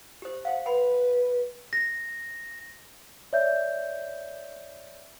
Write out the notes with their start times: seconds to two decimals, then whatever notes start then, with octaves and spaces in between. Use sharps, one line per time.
0.22 G4 C5
0.45 C5 F5 F#5
0.66 B4 F#5 B5 C6
1.73 A#6
3.33 C#5 D5 E5 G6